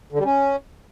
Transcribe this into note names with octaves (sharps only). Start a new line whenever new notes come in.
D3
G3
C#4